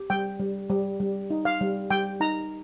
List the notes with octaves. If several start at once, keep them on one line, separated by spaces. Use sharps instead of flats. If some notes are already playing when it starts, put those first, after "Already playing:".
Already playing: G4
G3 G5
G3
G3
G3
D#4
F5
G3
G3 G5
D#4 A#5